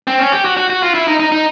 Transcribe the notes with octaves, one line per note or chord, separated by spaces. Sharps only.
C4
C#4
G4
F#4
F#4
F#4
F4
E4
D#4
D#4
D#4